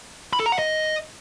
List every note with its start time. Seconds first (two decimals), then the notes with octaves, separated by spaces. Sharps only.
0.33 B5
0.40 A4
0.46 A#5
0.52 F#5
0.59 D#5